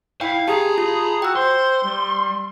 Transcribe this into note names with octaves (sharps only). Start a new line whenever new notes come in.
E4 F5 G5
G4 G#4 A5 A#5
F4
F#4 G5 E6
C5 C6
G3